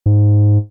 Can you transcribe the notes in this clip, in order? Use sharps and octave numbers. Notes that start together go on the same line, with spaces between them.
G#2